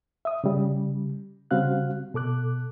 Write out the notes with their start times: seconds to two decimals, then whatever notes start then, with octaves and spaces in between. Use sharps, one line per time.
0.25 E5 D#6
0.44 C#3 G3
1.51 C#3 G3 C4 F#4 F5 F#6
2.14 B2 A4 D6 F#6